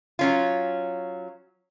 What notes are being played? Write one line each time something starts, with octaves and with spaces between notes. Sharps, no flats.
F#3 C#4 F4